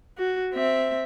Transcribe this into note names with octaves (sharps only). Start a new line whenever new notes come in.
F#4
C4 E5